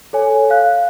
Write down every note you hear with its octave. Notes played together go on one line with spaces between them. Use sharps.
A4 C#5 G#5
F5 F#6